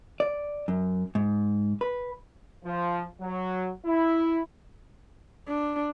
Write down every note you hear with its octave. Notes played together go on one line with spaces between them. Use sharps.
D5
F#2
G#2
B4
F3
F#3
E4
D4